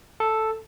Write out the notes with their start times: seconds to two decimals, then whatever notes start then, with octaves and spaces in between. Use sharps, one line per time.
0.20 A4